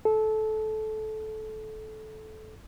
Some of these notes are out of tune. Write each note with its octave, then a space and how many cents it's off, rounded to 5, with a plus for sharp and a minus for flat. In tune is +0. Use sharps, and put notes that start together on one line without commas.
A4 -20